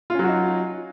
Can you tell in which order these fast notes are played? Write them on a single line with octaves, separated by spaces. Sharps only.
F4 C#4 F#3 F#4 D#4